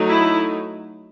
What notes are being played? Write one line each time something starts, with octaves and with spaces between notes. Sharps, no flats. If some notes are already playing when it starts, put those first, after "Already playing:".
Already playing: F#3 A3 D#4
E4